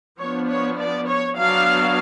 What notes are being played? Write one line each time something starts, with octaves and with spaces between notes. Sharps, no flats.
F3 B3 D4 C#5
C#5
D5
C#5
F#3 B3 D4 F5